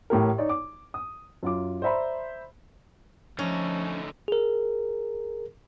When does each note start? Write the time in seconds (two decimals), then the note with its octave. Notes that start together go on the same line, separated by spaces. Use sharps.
0.10 A1 A2 G4 A#4
0.38 D#4 C#5 D5
0.49 D6
0.94 D#6
1.43 F#2 F4 D6
1.82 C5 D5 E5 A#5 B5
3.39 D3 F3 A3 C#4 D#4
4.28 G#4 A#4